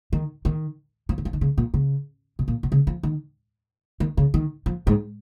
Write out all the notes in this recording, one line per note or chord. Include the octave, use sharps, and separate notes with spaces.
D#3
D#3
F3
D#3
F3
D#3
C#3
A#2
C#3
B2
A#2
B2
C#3
F3
D#3
D#3
C#3
D#3
F3
G#2